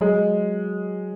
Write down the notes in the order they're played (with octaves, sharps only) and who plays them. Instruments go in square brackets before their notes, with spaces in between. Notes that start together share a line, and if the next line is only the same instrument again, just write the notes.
[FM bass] F#3 [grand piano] G#3